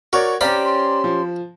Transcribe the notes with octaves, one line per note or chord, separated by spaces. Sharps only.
F#4 A#4 C#5 D5
C#4 G4 C5 D5 F5 A#5 B5
C6
F3